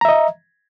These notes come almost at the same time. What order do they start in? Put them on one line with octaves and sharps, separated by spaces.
A#5 E5 D#5